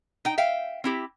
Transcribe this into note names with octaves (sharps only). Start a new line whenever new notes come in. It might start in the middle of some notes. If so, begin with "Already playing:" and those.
D#4 G5
E5 F5 G5
C4 E4 G4